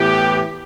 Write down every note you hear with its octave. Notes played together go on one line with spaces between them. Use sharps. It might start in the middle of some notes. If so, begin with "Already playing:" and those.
Already playing: A2 E3 B3 G4